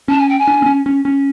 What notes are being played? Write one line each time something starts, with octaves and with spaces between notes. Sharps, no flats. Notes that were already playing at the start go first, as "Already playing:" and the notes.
C#4 A5
G#5
G5
G#5
D4
C4
C#4
C#4
C#4